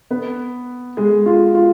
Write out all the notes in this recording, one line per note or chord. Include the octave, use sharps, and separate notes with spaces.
B3 B4
G#3 G#4
F4
F4